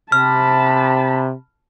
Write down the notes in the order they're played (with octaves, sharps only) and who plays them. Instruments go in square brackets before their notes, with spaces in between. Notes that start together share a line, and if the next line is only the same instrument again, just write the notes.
[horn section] C3 [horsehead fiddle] A5 B5 [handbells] F6